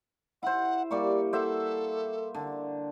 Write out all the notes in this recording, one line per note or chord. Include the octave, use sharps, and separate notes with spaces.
E4 C5 F#5
G3 A#3 D5 C#6
A4 C5 E5 F#5
D3